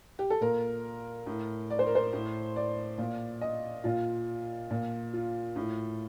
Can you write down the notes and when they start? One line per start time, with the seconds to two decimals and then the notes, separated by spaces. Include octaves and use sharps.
0.19 G4
0.30 A4
0.41 A#2 A#4
1.27 A2
1.70 D5
1.79 C5
1.87 A#4
1.95 C5
2.13 A2
2.56 D5
2.98 A#2
3.41 D#5
3.84 A#2 F4
4.71 A#2
5.13 F4
5.56 A2